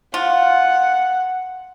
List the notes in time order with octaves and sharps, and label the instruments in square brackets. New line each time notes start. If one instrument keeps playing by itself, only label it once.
[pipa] F4 [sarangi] F#5